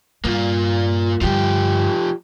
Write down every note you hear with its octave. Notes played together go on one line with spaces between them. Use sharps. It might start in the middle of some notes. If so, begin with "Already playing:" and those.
G2 A#3 F4
G2 D3 F3 G4